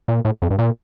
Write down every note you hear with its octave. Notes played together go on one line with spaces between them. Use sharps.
A#2
A2
F2
G2
A#2